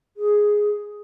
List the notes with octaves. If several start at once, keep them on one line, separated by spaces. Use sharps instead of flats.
G#4